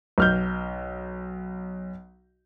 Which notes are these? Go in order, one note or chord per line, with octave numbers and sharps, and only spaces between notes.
B1 F6 G6